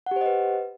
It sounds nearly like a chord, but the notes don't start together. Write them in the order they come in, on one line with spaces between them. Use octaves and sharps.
F#5 G4 C5 D#5 B4